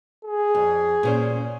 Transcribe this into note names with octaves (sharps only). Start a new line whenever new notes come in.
G#4
F2
A#2 C#4 C5